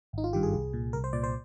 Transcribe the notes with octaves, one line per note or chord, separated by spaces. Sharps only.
G#1 D#4
F4
G2 D#3 G4
G#4
C2 G#4
A#2
C2 A#4
C5
A#2 D5
C5